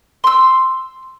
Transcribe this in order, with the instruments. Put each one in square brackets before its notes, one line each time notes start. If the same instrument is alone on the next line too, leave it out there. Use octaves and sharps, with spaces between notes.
[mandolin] C6 E6